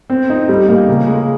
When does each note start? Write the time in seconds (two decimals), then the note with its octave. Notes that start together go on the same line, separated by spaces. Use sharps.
0.10 C4
0.30 D#4
0.49 G3
0.69 A#3
0.89 C#3
1.08 G#3